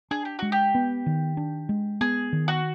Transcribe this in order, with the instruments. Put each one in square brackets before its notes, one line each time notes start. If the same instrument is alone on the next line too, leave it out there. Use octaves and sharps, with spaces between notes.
[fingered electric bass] D4 [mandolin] G#4
[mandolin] G4
[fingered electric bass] G#3 [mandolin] F#4
[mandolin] G4
[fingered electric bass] B3
D#3
D4
G#3
[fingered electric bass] B3 [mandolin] G#4
[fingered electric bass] D#3
[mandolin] F#4